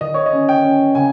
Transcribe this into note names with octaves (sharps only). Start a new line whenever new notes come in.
D#3 D#5
C#5
D#5
C#4
G5
C#4
C#3 G#5